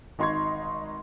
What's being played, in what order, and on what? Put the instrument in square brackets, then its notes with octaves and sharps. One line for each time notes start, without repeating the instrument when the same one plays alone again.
[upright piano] G#1 D#4 C6 C#6 G#6